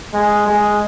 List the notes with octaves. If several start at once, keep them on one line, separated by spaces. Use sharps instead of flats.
G#3
G#3